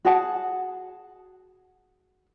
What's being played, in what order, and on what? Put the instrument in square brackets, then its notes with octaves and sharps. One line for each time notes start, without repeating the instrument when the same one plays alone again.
[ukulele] F#4 G#4 F#5 A5